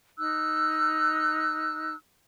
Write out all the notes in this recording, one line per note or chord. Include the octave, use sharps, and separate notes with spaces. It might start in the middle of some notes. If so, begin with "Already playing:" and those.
D#4 E6 F#6